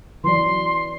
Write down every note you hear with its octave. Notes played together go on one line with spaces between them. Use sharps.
E3 F#3 D5 C6